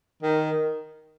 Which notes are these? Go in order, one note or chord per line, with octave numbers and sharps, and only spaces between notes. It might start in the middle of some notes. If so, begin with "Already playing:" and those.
D#3